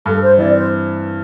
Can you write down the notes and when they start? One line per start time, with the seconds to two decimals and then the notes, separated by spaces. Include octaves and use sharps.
0.06 G2 A4
0.21 C5
0.38 E3 C4 E4 D5
0.54 C5